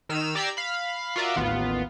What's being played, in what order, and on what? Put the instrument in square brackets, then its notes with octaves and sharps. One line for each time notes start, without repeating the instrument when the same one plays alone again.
[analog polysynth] D#3 E6 F6 D#7
G4 D5 A#5 E6 G#6 C7
F5 B5
F4 F#4 A#4 D5 E5
A1 D#2 B3 F4